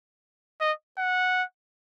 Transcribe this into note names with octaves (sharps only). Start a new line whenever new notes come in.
D#5
F#5